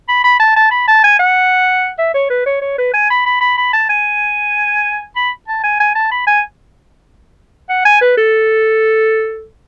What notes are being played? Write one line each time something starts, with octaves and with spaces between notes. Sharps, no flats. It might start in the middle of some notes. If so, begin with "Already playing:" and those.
B5
B5
A5
A5
B5
A5
G#5
F#5
E5
C#5
B4
C#5
C#5
B4
G#5
B5
B5
B5
B5
A5
G#5
B5
A5
G#5
G#5
A5
B5
G#5
F#5
G#5
B4
A4